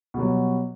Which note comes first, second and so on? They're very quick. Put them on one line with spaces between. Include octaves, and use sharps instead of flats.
B2 G3 F#3